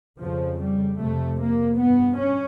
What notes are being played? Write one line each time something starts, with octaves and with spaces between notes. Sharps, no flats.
F2 C#3 F3
G3
F2 C3 A3
A#3
G2 B3
C#4